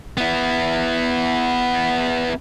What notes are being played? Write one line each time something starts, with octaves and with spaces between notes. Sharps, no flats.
B3 E4